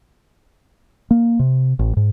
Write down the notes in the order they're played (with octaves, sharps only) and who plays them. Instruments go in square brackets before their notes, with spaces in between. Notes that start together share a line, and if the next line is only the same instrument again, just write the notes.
[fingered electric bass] A#3
C3
A1
G#2